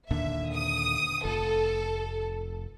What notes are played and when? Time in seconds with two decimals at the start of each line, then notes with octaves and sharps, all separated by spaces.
0.10 D#2 A#2 D3 E5
0.54 D#6
1.25 F1 A4